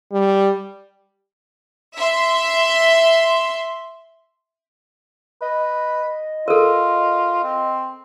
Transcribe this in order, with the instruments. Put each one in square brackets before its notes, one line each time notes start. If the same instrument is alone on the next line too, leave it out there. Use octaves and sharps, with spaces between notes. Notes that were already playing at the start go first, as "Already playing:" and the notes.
[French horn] G3
[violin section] E5 C6
[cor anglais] B4 [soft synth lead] D#5
[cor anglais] F4 [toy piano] A4 A#4
[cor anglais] C4